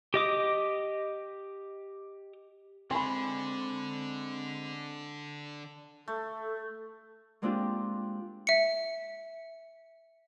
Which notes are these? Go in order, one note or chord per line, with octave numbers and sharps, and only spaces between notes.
G4 D#5 D6 D#6
D3 G#3 C4 G#5 B5 C6
A3 A4
G#3 A#3 C4 D4 F4 G4
E5 C#7